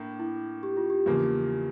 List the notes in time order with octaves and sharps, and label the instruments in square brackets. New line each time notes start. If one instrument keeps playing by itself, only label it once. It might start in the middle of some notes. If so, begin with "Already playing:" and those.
Already playing: [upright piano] A2 A#3 [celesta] D4
[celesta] E4
G4
F4
G4
[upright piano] E2 C#3 F3 A#3